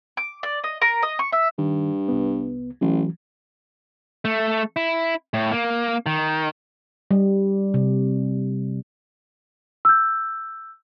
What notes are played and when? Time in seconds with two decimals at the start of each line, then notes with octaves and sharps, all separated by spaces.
0.17 D6
0.43 D5
0.64 D#5
0.82 A#4
1.03 D#5
1.19 C#6
1.32 E5
1.58 G2 D#3
2.09 C2 B3
2.81 A1 E3 F#3
4.25 A3
4.76 E4
5.34 A2
5.52 A#3
6.06 D#3
7.11 G3
7.74 C3
9.85 E6 G6